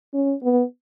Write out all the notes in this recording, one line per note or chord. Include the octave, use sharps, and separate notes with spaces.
C#4
B3